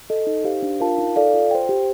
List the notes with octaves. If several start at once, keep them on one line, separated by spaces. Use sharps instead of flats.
A4 D#5
D#4
G4 C5 F5
D4
F4 A#4 F5 A5
D#4
A4 D5 F5
F4
C5 G5
G4